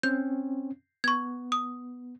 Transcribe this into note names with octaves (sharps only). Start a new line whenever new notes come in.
C4 C#4 G6
B3 C#6 G#6
D#6